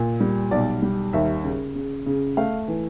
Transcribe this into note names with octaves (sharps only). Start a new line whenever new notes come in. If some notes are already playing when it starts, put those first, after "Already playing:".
Already playing: A#2
G3
B1 D5
G3
D#2 E5
C#3
C#3
C#3
A3 F5
E3